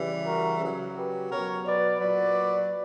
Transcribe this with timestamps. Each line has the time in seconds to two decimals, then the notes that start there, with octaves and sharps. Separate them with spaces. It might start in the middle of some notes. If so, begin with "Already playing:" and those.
Already playing: C#3 E3 G3
0.25 F#4 A#4
0.61 C#3 F#3
0.96 G4 B4
1.30 B2 F#3 A#4 C#5
1.65 B4 D5
2.00 A#2 F#3 B4 D5